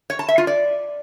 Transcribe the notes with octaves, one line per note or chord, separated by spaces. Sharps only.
C#5
A5
E5
F4
D5